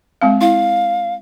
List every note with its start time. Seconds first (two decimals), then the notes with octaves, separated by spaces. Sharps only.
0.21 G#3 C4 F5
0.41 E4 F5